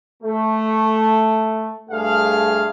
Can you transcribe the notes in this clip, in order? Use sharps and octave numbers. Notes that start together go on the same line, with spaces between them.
A3
G2 A3 G#4 F5